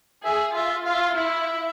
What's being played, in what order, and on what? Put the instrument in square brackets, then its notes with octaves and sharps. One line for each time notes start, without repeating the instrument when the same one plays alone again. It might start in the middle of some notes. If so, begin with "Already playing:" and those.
[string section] G#4 [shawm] E5
[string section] F4 [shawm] E5
[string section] F4 [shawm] F5
[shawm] E5
F5
[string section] E4 [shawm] E5